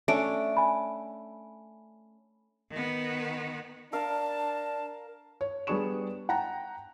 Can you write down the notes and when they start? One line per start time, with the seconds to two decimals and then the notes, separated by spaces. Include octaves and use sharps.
0.08 A3 C#4 D4 E5 D7
0.57 G#5 B5
2.70 D#3 B3
3.93 D4 A#4 F5 A5
5.41 C#5
5.67 G3 B3 D4 G#4 C#6 E7
6.29 F#5 G5 A5 A#5